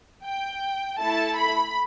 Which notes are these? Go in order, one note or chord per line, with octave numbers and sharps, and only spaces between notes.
G5
A3 E4 A4 A5
B5